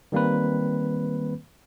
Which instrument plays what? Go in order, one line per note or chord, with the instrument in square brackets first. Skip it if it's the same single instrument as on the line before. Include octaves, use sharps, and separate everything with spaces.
[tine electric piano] D#3 G3 A#3 C4 B4